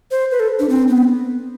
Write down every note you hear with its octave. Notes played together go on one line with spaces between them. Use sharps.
C5
B4
A4
D4
C4
B3